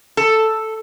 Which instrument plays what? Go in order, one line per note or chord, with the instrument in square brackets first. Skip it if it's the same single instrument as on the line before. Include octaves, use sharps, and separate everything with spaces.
[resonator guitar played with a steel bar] A4